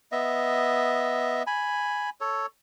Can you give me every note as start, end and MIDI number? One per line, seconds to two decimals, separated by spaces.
0.12 1.43 59
0.12 1.43 75
0.12 1.43 76
1.47 2.10 80
1.47 2.10 83
2.21 2.46 69
2.21 2.46 73